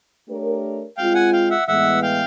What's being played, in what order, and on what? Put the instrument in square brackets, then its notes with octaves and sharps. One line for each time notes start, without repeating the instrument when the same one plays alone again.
[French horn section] A3 D4 G4 A#4 C#5
[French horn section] G#3 C4 F4 [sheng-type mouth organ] F5 G5
[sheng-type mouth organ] F#5 G#5
F5 G5
E5 F#5
[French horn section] A2 E3 G#3 B3 E4 [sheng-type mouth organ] E5 F#5
[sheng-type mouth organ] F5 G5